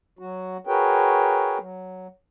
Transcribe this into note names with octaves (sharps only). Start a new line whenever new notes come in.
F#3 F#4
F#4 G#4 A#4 B4 C#5 G5
F#3